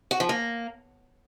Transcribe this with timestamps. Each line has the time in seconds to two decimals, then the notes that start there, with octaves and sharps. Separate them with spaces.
0.11 F#4
0.20 F3
0.29 A#3